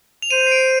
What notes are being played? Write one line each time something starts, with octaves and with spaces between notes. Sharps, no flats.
F7
C5 D#7
C7
D7